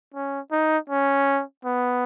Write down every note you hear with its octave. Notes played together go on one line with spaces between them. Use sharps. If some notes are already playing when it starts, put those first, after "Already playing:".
C#4
D#4
C#4
B3